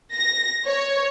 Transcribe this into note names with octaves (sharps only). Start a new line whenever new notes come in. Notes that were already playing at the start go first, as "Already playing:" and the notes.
A#6
C#5